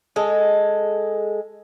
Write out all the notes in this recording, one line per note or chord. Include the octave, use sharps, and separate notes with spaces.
G#3 A4